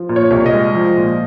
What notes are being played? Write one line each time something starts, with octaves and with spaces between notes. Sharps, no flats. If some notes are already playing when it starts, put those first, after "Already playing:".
Already playing: F3
A#2
C#5
C2
D#5
G#3
F3
A#2